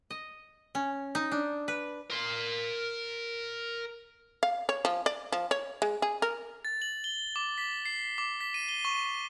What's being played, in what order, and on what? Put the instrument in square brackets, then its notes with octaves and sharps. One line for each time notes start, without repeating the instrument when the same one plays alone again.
[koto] D#5
C#4
D#4
D4
B4
[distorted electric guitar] A#4 C6
[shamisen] F5
C#5
F3
D5
F3
C#5
G#3
G#4
A#4
[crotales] A6
F#7
G7
D6
B6
C7
D6
B6
D#7
G7
C#6